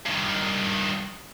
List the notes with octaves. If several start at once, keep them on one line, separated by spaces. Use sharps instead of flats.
G2 D#3